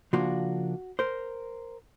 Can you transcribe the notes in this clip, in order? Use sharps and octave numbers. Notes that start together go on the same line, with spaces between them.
C#3 F3 A#3 D4 F4 F#4
A#4 C5